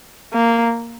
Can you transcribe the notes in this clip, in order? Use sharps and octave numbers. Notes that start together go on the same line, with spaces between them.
A#3